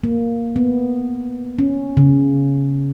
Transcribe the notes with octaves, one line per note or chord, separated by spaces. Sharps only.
A#3
B3
C#4
C#3